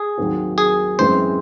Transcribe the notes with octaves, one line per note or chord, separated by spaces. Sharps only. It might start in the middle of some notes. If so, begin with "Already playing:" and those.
Already playing: G#4
D#2 D#3 F#3 C4 F#4
G#4
F#2 E3 G#3 C4 C5